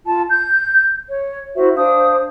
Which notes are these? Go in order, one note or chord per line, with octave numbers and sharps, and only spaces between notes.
F4 A5
G6
C#5
E4 F#4 C5 E5
D4 C5 F5 D#6